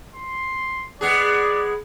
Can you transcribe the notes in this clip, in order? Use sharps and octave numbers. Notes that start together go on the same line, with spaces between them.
C6
G#3 B3 G#4 D5